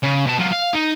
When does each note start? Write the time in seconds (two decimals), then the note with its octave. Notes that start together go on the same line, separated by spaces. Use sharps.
0.03 C#3
0.26 B2 A5
0.40 F#3 F4
0.53 F5
0.74 D#4